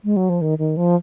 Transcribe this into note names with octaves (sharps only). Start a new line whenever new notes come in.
G#3
F#3
F3
D#3
D#3
F3